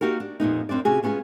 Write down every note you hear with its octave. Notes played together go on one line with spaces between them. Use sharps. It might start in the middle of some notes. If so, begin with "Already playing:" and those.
A#3 D#4 F#4 G4 A#4
D4
F2 A#2 B3 D#4
F#2 C4 D4 D5
C3 C#4 F#4 G#4
G#3 B3 C#4 F4 G#4